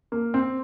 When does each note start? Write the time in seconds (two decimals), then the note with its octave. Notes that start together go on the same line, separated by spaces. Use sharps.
0.12 A#3
0.34 C4